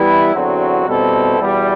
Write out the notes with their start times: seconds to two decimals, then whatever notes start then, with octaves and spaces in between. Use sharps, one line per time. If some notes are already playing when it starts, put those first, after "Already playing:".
Already playing: E3 G3 B3 E4 G4
0.33 E2 D3 F#3 C4 F#4
0.86 B2 G3 C4 E4 A4
1.40 E2 B2 G3